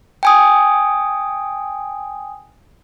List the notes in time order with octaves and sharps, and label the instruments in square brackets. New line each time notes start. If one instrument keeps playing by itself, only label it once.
[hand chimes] G5 G#5 D#6